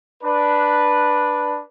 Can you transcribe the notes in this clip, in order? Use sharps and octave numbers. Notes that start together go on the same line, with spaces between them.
D4 B4